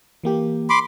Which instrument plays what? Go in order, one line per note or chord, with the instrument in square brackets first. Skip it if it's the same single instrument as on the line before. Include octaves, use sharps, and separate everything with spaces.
[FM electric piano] E3 A#3 G4
[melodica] B5 C6 D6